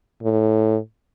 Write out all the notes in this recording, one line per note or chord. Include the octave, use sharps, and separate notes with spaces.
A2